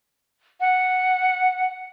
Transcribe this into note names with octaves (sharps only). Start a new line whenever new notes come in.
F#5